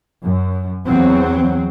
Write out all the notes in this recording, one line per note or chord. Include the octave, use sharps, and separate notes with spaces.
F#2
E2 F#3 C4